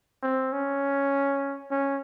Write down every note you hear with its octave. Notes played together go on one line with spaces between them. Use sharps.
C4
C#4
C#4